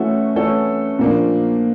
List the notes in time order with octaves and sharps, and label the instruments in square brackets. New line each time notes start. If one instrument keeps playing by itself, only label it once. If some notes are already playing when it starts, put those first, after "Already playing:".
Already playing: [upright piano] E3 A3 C#4 F#4 A4
E3 A3 C#4 F#4 A4
A#2 F3 A#3 D4